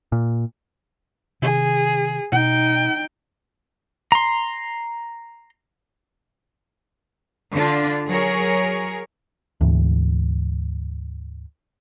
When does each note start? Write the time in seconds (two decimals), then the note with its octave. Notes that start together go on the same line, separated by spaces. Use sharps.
0.12 A#2
1.42 C3 D#3 G#4
2.32 B2 D#4 G5
4.12 A#5 C6
7.52 D3 D4 F4
8.08 F#3 G#4 A#4 C#5
9.61 D2 G#2 E3